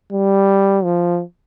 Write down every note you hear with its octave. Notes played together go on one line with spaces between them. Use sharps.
G3
F3